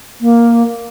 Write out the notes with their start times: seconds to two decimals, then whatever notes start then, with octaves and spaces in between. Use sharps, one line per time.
0.21 A#3